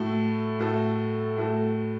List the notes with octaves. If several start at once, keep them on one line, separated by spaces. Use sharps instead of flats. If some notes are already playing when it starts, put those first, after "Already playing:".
Already playing: A2 A3 F#4 A4
A2 A3 F#4 A4
A2 A3 F#4 A4